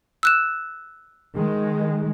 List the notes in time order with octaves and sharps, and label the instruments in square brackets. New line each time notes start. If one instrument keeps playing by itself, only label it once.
[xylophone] E6 F#6 E7
[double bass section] D#3 G#3